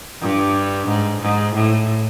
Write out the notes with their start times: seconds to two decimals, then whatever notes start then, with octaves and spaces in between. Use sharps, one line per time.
0.21 G2
0.88 G#2
1.21 G#2
1.54 A2